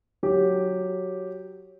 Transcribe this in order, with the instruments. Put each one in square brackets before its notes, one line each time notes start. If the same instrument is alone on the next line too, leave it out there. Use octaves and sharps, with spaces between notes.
[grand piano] F#3 G4